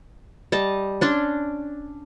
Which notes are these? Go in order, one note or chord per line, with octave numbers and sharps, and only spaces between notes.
G3 D#5 A5
C#4 D4 D5 C6